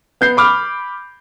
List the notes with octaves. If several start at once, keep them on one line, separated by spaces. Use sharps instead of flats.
B3 G6 C7
B5 D6 F6